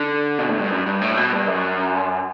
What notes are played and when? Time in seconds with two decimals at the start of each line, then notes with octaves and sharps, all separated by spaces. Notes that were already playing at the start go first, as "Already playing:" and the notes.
Already playing: D3
0.39 B2
0.49 A2
0.59 G2
0.70 F#2
0.86 G2
1.01 A2
1.17 B2
1.33 G2
1.48 F#2